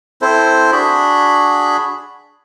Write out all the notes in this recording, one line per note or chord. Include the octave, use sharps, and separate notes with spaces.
C4 E4 A4 C5
D4 F#4 G#4 B5